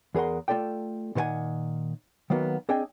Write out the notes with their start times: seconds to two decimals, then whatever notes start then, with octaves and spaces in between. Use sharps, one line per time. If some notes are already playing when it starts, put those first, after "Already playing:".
0.15 E2 G#4 A#4 F#5 C6
0.48 A3 F4 A4 D5 G5
1.15 A#2 D#3 C5 F#5 G#5
2.30 D#3 F#3 A#3 B3 F#4
2.69 C4 D4 G#4 D#5 G5 G#5